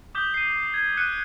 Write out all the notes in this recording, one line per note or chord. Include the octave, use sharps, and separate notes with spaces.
D6 D#6 G6 B6 G7
C7 D#7
G#6
F#6 C#7 D#7